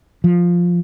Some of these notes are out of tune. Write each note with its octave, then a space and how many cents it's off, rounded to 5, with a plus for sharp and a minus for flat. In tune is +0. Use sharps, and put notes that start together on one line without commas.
F3 +5